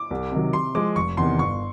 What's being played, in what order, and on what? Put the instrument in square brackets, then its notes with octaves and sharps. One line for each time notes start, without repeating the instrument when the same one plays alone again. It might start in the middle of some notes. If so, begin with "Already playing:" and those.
Already playing: [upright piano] D6
[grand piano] C2
C3 D#3 F#3
[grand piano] C3 [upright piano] C6
[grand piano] F3 G#3 [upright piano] D6
[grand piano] F1 [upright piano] C#6
[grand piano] E2 C3 D#3 [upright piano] C6
[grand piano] G1 [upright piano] C#6